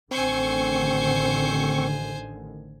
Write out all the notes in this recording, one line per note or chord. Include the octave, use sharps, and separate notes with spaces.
A1 D3 D#3 C4 C5 G#5 C#6